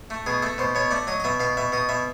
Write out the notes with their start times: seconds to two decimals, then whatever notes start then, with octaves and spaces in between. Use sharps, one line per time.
0.10 A3
0.26 B2 G#4
0.42 A3 A4
0.58 B2 C5
0.75 B2 C#5
0.91 A3 D5
1.07 F#3 D#5
1.20 D#5
1.24 B2 E5
1.40 B2 F5
1.57 B2 E5
1.72 B2 D#5
1.89 B2 E5